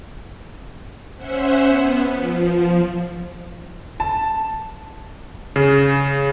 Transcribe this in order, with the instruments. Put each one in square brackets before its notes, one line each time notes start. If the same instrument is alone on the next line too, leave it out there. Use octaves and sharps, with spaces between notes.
[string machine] C#4 C5 E5 F#5
B3
F3
[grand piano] A5
[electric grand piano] C#3